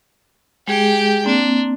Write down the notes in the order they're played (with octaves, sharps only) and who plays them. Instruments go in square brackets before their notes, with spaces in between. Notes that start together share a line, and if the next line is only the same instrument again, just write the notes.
[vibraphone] G#3 G#4 [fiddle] G4 G5
[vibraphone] A#3 C4 [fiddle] D4